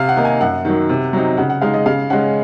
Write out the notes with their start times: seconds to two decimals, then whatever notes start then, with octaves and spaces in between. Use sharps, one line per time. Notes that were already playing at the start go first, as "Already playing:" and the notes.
Already playing: C3 F5
0.09 F#5
0.17 D#3 A#3 D#4
0.25 G#5
0.41 F#2 F#5
0.65 D#3 F#3
0.89 C3
1.13 F#3 C4 D#4
1.37 C#3 F#5
1.50 F#5
1.61 G#3 D#4 F5
1.74 D#5
1.86 C#3 F5
2.10 G#3 C#4 F#5